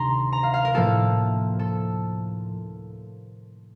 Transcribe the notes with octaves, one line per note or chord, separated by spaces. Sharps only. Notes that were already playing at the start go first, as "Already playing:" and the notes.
Already playing: D2 C3 D#3 A#5 C6
A#5
F5
F5
A#4
A2 F3 A#3 A4
A4